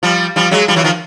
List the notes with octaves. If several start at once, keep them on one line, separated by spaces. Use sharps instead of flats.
F3 G3
F3 G3
F#3 G#3
F3 G3
E3 F#3
D#3 F3